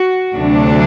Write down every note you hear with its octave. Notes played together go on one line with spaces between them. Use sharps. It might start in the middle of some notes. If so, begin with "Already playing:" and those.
Already playing: F#4
D2 C3 F#3 A3 D4